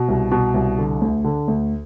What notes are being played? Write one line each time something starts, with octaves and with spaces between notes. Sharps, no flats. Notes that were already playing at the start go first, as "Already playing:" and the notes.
Already playing: B2
C2
B2
C2
D3
D2
D3
D2